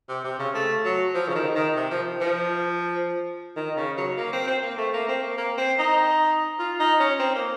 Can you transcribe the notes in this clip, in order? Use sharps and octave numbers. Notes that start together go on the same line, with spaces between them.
C3
C3
C#3
A3
F#3
F3
C#3
D#3
D#3
C3
F3
F3
D#3
C#3
F#3
A#3
C4
C4
A#3
A3
A#3
C4
A#3
A#3
C4
D#4
F4
D#4
C#4
C4
A#3